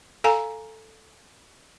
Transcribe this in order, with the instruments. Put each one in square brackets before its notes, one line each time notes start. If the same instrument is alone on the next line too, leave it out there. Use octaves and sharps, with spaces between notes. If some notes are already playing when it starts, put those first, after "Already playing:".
[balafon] A4 F5 G#5 A#5